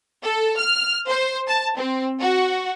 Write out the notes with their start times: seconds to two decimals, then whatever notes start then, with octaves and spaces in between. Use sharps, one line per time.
0.22 A4
0.57 F6
1.08 C5
1.47 A5
1.77 C4
2.19 F#4